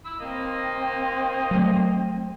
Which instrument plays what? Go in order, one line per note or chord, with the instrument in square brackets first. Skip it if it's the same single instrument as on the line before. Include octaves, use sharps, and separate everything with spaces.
[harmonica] B5 E6
[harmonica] A#3 D#5 [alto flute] C4
[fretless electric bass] F#3 A3